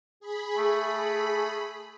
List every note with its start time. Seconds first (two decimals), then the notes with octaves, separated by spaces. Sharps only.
0.20 G#4 B5
0.58 A3